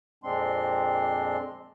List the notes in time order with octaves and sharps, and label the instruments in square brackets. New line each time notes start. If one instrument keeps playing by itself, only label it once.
[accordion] F2 A#2 G#3 C4 D4 C6